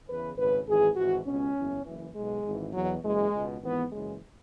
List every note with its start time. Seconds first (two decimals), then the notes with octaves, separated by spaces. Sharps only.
0.08 E2 C#3 E3 B4
0.37 G#1 F#2 C#3 B4
0.67 G#1 F#2 E3 G#4
0.96 G#1 G#2 E3 F#4
1.26 C#2 B2 C#4
1.56 F#1 E2 E3
1.86 F#1 F#2 E3
2.15 B1 B2 G#3
2.45 G#1 G#2 E3
2.74 E2 B2 F#3
3.03 F#1 F#2 E3 G#3
3.34 C#2 B2
3.62 G#1 G#2 E3 B3
3.92 F#1 F#2 C#3 E3 G#3